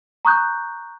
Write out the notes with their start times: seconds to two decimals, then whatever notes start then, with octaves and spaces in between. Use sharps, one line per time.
0.25 A#5 C#6 D#6 F#6 G6